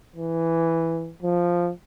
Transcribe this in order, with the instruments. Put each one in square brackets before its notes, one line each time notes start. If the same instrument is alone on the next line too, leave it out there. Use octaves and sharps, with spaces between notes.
[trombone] E3
F3